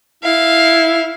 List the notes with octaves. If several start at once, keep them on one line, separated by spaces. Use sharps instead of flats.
E4 F5